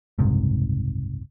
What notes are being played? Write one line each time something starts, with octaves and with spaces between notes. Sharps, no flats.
F#1 C2 G#2 C3